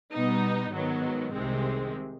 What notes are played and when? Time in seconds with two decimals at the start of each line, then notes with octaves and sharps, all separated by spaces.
0.13 B2 G3 B3 D#4
0.73 G#2 D#3 F#3 B3
1.31 C2 C3 D#3 G#3 C4